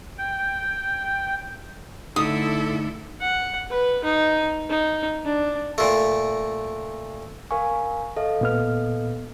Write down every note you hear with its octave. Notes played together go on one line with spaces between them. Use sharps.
G5
D3 A3 D#4 E4 A4 D#6
F#5
B4
D#4
D#4
D4
A#2 A3
A#4 F5 G#5 C#6
A4 D#5 F5
A#2 B3 F6